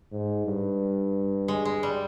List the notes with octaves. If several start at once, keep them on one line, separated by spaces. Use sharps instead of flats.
G#2
G2
G#3
G#3
G3